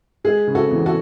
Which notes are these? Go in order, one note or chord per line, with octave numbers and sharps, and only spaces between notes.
G#3 G#4
C#3
F#4 A4
E2
F#4 A4